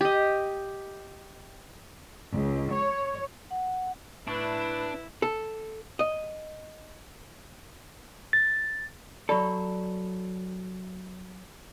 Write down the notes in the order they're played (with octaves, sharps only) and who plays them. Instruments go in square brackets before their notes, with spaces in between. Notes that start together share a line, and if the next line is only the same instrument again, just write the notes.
[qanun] G4 D#5
[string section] C#2
C#5
[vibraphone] F#5
[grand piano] A2 [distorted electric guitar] D4 [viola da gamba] E4 [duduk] B4
[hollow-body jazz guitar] A4
D#5
[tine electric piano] A6
[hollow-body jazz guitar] F#3 A4 [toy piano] D5 B5 C#6